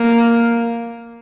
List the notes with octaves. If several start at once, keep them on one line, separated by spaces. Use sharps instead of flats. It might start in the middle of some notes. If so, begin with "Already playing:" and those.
Already playing: A#3